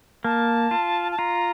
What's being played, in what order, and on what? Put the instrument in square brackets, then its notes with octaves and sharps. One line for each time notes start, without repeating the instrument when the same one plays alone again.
[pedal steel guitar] A#3 [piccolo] A5
[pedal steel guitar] F4
[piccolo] A5
[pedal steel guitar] F4 [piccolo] A#5